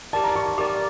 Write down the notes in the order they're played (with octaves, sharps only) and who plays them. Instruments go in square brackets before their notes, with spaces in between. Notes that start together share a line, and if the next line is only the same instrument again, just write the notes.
[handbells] G4 A#4 D5 [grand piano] A5
[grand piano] A#5
C#6
C#6
[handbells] G4 A#4 D5 [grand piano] D6